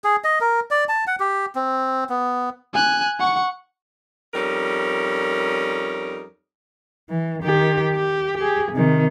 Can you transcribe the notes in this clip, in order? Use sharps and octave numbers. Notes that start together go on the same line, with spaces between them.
G#4
D#5
A#4
D5
A5
F#5
G4
C4
B3
G#5 F#6
F#5 C#6
F2 G3 C#4 D#4 A#4
E3
D#3 G4
G4
G4 G#4
C3 D#3